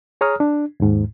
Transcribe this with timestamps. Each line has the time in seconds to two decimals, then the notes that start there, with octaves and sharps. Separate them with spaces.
0.21 G#4 C#5 A#5 D#6 F6
0.40 D4
0.80 D#2 G#2